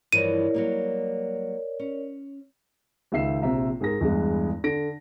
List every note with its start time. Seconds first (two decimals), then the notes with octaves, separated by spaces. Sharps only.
0.13 G2 E3 F3 A#4 C#5 D5 D#7
0.54 F#3 G3 A#3
1.80 C#4
3.12 C#2 D#3 E5 C7 E7
3.42 A#1 C3 E5 A#5
3.81 G#2 G#4 A#4 A#6
4.01 E2 G2 G#3
4.64 D3 A#6 D7